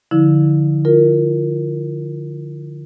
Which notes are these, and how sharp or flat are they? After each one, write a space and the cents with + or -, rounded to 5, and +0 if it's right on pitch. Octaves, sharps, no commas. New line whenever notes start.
D3 +0 F3 +0 E4 -25
F4 +0 A#4 +0